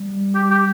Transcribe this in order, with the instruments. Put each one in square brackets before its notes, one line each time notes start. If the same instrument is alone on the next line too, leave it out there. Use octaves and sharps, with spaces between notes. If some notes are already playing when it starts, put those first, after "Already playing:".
Already playing: [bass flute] G3
[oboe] G4
G4